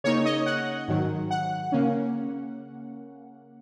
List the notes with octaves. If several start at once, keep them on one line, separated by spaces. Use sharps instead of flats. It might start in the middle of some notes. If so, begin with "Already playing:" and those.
C#3 A#3 D#4 C#5
D#5
F#5
G#2 D#3 F#3
F#5
C#3 A#3 C#4